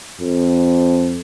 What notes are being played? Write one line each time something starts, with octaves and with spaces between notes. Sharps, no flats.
F2